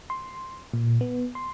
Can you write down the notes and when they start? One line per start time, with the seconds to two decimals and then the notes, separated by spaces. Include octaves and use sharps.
0.10 C6
0.74 A#2
1.01 B3
1.35 C6